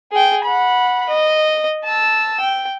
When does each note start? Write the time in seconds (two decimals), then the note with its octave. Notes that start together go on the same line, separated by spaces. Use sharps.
0.12 G#4 G5
0.44 F#5 B5
1.09 D#5
1.84 A5 E6
2.40 G5